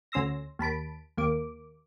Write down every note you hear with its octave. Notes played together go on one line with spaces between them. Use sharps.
D2 C#4 C6 E6 A#6
D#2 A5 B5 D7
D#2 A#3 D6